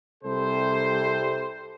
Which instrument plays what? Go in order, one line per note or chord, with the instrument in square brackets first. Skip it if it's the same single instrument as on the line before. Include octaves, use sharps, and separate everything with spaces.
[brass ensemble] C2 C3 G3 A4 C5